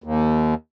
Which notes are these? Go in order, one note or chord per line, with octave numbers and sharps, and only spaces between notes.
D#2